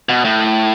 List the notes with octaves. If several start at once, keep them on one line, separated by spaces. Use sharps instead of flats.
B2
A2